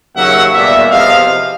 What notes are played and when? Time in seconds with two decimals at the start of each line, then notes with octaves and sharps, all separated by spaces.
0.15 D#2 C#3 F#3 A#3 C#4 E5 F#5
0.53 E2 B2 G3 A#3 D5 E5
0.91 E2 C3 F3 D#5 F5